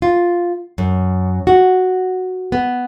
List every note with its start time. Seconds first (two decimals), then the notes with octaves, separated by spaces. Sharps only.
0.02 F4
0.78 F#2
1.47 F#4
2.52 B3